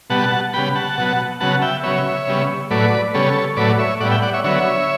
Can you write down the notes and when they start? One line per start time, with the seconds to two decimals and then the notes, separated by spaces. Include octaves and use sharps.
0.10 B2 G3 B3 F#5 A5
0.53 C#3 G3 B3 G5 B5
0.75 F#5 A5
0.98 B2 F#3 B3
1.40 C#3 F#3 B3 F#5 A5
1.62 E5 G5
1.83 C#3 F#3 B3 C#5 E5
2.27 C#3 G3 B3
2.70 A2 F#3 A3 B4 D5
3.14 C#3 G3 B3 A4 C#5
3.57 A2 F#3 A3 B4 D5
3.79 C#5 E5
4.00 A2 D5 F#5
4.03 G3 B3
4.11 E5 G5
4.22 D5 F#5
4.33 C#5 E5
4.44 D3 F#3 B3 C#5 E5